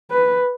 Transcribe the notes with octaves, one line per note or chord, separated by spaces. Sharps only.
B4